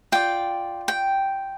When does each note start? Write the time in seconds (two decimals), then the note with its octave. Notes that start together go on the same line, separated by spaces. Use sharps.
0.12 F4 D5 G5
0.88 G5